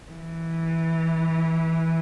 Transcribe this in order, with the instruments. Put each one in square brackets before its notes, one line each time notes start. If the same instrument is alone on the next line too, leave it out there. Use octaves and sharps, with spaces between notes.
[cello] E3